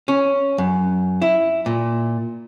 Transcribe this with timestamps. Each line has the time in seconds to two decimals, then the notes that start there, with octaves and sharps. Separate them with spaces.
0.08 C#4
0.58 F#2
1.22 E4
1.66 A#2